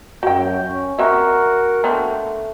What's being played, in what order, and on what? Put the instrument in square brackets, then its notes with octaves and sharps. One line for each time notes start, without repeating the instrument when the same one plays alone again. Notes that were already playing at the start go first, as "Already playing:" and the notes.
[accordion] F#2 G6 [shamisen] F#4 G5
[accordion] C#4
[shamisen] C4 E5 [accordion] F#4 A#4 F#5
[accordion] A3 [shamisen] B3 C4 D4